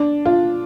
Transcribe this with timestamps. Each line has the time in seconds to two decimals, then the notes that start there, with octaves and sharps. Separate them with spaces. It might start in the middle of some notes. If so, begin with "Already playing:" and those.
Already playing: D4
0.25 F4